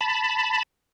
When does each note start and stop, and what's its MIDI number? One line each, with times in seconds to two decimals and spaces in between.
0.01 0.63 81
0.01 0.63 83